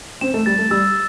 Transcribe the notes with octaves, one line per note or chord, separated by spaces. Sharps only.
C4 E7
A3
G3 A6
A3
G3 E6